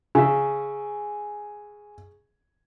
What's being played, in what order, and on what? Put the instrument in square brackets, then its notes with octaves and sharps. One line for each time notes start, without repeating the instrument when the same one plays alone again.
[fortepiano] C#3 E5 [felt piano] G#5